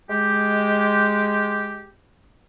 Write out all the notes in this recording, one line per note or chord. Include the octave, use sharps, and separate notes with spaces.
G#3 G4